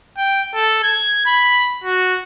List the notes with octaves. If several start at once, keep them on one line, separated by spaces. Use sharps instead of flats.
G5
A4
G#6
B5
F#4